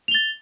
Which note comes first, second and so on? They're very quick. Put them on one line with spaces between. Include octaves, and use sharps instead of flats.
F7 G7 A6